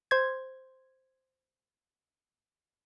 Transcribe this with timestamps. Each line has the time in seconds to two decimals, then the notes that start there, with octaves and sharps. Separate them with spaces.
0.11 C5 G#6